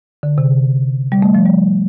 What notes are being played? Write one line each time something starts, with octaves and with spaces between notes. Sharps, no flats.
D3
C3
G3
A3
F3
G3